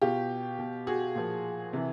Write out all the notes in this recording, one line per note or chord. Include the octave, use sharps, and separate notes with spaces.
B2 F4 G4
B2
F#4 G#4
A#2 F3
C3 E3